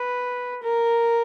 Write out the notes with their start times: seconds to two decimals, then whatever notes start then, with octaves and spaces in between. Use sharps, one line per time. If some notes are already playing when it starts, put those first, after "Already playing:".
Already playing: B4
0.62 A#4